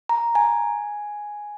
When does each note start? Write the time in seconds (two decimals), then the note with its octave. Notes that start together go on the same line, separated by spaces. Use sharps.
0.09 A#5
0.35 G#5